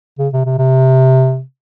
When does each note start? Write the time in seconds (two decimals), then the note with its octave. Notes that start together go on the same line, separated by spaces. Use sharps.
0.19 C#3
0.33 C3
0.45 C3
0.58 C3